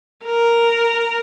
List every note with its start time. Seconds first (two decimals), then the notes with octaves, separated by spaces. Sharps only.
0.25 A#4